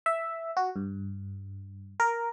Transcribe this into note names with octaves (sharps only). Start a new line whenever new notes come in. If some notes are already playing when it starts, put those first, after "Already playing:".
E5
F#4
G2
A#4